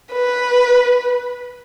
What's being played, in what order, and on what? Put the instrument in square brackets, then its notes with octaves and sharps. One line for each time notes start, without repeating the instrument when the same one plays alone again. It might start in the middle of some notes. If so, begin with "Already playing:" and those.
[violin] B4